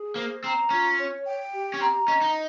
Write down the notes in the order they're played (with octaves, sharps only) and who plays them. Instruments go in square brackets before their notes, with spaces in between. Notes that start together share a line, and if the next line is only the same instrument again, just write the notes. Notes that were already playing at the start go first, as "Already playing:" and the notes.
Already playing: [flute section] G#4
[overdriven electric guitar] A#3 [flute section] C5
[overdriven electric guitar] C4 [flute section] A#5
[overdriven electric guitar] C#4 [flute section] F4
[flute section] C#5
G5
G4
[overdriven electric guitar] C#4
[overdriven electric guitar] C4 [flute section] A#5
[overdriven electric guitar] C#4 [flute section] D#5
[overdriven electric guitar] D#4